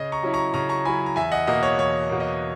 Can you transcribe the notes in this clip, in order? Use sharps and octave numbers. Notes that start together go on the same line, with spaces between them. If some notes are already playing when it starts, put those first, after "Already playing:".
Already playing: C#3 D#5
A#5 C#6
F#3 C#4 E4
A#5 C#6
C#3 A#5 C#6
A#5 C#6
F#3 C#4 E4 G#5 B5
A#5
E2 E5 G#5
D#5 F#5
B2 A#3 D#5
C#5
E2 C#5
B2 A#3
D#5